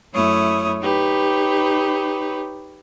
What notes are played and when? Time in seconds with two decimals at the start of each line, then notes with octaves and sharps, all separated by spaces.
0.13 F#2 A3 E4 C#5 D#6
0.82 D#4 G4 B4 C#5